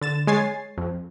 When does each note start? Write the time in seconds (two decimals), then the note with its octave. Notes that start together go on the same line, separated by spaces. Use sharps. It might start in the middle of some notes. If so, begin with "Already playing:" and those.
0.02 D3 A6 E7
0.27 G#3 C#5 G#5 A6 C7
0.78 F2